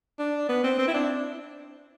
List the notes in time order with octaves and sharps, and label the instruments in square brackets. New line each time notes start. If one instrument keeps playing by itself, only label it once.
[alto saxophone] D4
B3
C4
C4
E4
D4